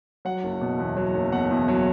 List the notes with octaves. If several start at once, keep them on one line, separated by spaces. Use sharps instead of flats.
F#3 F#5
F#1
B2
E2
F#3
F#1
B2 F#5
E2
F#3